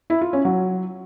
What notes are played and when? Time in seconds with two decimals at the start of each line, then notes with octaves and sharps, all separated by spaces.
0.10 E4
0.21 F4
0.33 C#4
0.45 F#3